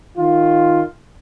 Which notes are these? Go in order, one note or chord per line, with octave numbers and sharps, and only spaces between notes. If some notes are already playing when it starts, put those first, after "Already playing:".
D#3 F4